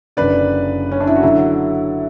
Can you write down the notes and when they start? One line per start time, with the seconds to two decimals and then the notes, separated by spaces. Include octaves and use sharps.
0.17 F#1 F#2 D3 B4 D5
0.91 C#4
1.00 D4
1.07 E4
1.15 F#4
1.23 D3 F#3 E4